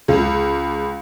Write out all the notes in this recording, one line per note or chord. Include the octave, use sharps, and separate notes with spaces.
C#2